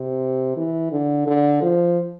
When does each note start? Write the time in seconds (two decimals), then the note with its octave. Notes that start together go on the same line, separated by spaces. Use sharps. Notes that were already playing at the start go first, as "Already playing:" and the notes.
Already playing: C3
0.56 E3
0.92 D3
1.27 D3
1.62 F3